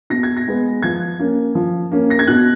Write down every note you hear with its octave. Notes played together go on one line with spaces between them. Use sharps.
B2 A#6
G#6
A#6
G#3 B3
F3 G#6
A#3 C#4
F3
A#3 C#4
A#6
G#6
B2 F#6